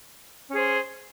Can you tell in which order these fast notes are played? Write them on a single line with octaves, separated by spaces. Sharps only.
C#4 G#4 C5